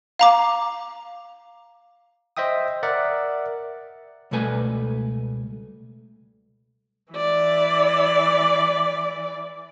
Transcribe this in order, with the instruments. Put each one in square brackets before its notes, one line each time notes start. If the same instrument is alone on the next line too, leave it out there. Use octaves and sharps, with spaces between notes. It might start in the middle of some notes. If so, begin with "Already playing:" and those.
[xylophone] F5 A#5 D6
[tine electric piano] C5 D#5 E5 G5 D#6
A#4 D5 E5 F#5
[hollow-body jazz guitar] C#2 B2 G3 A3 B4 G#5
[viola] E3 D5